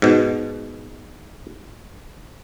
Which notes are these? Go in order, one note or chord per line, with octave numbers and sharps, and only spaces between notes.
G#2 B2